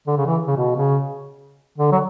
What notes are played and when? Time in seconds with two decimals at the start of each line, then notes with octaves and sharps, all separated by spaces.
0.07 D3
0.17 C#3
0.26 E3
0.47 C#3
0.56 B2
0.76 C#3
1.78 D3
1.92 F#3